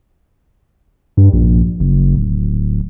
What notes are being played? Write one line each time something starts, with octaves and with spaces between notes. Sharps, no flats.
G2
A#1
F#1
D1